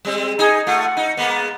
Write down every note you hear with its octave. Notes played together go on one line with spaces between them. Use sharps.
G3 G#3 C4
D#4 G#4
A3 F4 F#5
D#4
G#3 A#3 B3